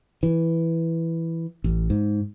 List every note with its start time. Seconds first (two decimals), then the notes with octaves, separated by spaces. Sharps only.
0.23 E3
1.64 A1
1.90 G#2